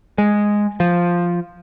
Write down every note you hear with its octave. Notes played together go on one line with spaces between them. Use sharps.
G#3
F3